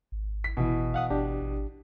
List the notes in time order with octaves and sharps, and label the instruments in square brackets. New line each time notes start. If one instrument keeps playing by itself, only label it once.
[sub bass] G#1
[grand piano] B6
[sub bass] G1 [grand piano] B2 E3
[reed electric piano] F5 F#5 D#6
[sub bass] G1 [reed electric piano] D4 G4
[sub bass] G#1